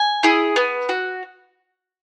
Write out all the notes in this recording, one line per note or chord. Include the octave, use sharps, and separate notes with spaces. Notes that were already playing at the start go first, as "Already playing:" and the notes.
Already playing: G#5
E4 G#4
B3
F#4